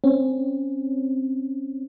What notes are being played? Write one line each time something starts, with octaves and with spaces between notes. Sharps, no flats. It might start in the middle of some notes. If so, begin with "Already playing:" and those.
C4 C#4